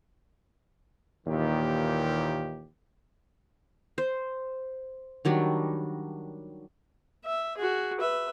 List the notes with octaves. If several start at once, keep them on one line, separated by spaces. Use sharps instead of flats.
D#2 A#2 D#3 E3 G4
C5
D#3 F#3 G3 D4
E5
F#4 G#4
B4 E5